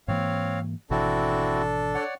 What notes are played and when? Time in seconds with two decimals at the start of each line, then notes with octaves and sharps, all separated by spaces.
0.08 G#2 E3 A#3 C4 C#5 F5
0.91 G#1 B2 E3 C4 D4 E4 F#4 A4
1.95 C#5 D5 F#5